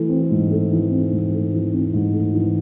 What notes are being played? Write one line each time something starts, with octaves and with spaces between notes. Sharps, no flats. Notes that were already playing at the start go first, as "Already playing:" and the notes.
Already playing: E3 A3
C4
G#2
A3
E3
C4
G#2
A3
E3
C4
G#2
A3
E3